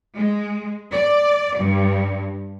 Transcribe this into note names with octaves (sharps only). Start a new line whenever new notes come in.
G#3
D5
G2